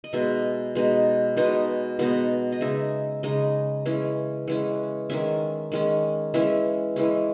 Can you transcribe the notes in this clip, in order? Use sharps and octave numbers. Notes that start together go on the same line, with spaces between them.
D#5
B2 G#3 D#4 E5
B2 G#3 D#4
B2 G#3 B3 D#4 D#5
B2 G#3 B3 D#4 F#5
D#5
C#3 G#3 D#4 E5
C#3 G#3 D#4 D#5
E3 G#3 C#4
E3 G#3 C#4 F#5
D#3 G#3 C#4 E5
D#3 G#3 C#4
E3 G#3 C#4 E5
E3 G#3 C#4